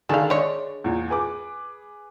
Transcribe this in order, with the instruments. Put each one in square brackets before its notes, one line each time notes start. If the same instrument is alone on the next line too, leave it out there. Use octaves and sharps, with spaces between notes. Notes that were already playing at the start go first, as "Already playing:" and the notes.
[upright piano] D3 D#3 G#4 [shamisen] A4 F5
[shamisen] G#3 C#5 [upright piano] D4
[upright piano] E2 A#2
G#4 B4 D6